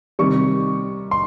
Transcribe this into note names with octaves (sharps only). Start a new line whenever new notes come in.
C3 D#3 G3 C#6
C6